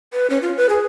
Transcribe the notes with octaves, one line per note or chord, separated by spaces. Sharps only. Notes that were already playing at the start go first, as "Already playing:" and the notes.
B4
C#4
F4
B4
G#4